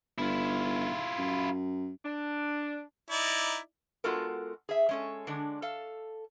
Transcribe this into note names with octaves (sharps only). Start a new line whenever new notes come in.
G1 E4 F4
F#2
D4
D#4 E4 D5
G#3 B3 F4 F#4 A4 A#4
G#4 E5
G#3 C#4 A4
D3 G#3 D4
A4 F5